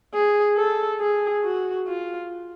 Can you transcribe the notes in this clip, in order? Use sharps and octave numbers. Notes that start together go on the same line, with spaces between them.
G#4
A4
G#4
F#4
F4